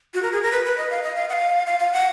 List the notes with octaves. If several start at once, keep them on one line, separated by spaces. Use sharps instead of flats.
F#4
A#4
G#4
A#4
B4
B4
D#5
F5
D#5
F5
F#5
F5
F5
F5
F#5